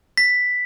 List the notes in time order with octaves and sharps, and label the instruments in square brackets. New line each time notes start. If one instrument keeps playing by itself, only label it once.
[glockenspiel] B6